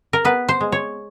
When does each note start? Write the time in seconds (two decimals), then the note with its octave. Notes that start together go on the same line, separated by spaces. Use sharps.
0.13 A#4
0.25 B3 B4
0.48 C5
0.61 G#3
0.72 C#5